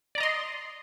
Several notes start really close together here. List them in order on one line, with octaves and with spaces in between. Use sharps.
D5 A#5 D#5 C6